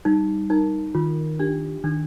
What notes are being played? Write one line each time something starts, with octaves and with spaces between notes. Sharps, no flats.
G3 D#4
D#4 A#4
D#3 F4
D4 G4
D#3 D4